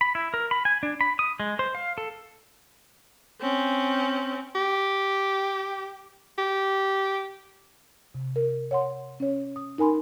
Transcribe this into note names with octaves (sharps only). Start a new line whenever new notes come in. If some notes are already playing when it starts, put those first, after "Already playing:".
B5
E4
A#4
B5
G#5
D4
B5
D#6
G#3
C5
F5
A4
C4 C#4
G4
G4
C3
A#4
C#5 F#5 C6
C#4 C#5
D#6
D#4 A#4 G#5 B5 C6